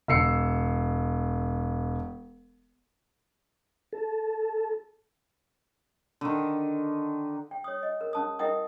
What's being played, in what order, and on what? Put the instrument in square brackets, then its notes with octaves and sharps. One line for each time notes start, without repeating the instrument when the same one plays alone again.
[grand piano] E1 E6 C7 C#7
[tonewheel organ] A4
[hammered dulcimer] D3 D#3
[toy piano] G5
C#5 D#6
D#5
A#4
C#4 A5 D#6
E4 A#4 D#5 F#5 G5 D#6